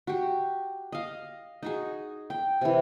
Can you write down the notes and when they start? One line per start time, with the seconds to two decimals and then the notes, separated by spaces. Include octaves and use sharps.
0.07 F#4 G4
0.92 D#5 F5
1.63 D#4 F#4 G#4
2.30 G5
2.61 C3 E3